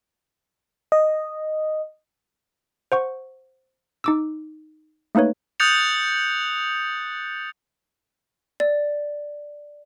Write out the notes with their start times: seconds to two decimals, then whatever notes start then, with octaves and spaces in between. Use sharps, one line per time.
0.92 D#5
2.92 C5 F#5 C#6
4.04 D#4 D6 E6
5.15 A3 A#3 D#4 B4 C#5
5.60 D#6 F#6 G6 A6 C#7 F7
8.60 D5